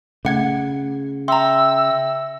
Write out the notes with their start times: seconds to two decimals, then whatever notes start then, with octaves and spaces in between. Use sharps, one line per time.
0.25 C#3 A3 F#5 G#6
1.28 E5 G5 A#5 C6 E6